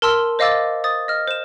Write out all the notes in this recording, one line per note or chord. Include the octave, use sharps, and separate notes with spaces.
A#4 A5 C6 E6 F6
C5 D#5 F5 D6 E6 A6
C5 D#6 A6
D#5 F6
C5 E7